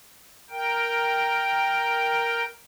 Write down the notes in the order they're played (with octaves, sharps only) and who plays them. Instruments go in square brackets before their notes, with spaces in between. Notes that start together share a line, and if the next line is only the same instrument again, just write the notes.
[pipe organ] A#4 G5